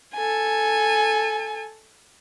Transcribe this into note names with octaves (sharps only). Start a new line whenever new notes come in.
A4 G#5